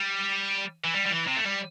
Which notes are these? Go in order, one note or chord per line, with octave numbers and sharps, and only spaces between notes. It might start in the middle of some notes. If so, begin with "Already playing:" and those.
Already playing: G3
E3
G3
G3
E3
C3
A3
G3